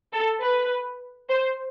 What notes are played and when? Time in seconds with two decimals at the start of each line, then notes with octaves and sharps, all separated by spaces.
0.13 A4
0.42 B4
1.29 C5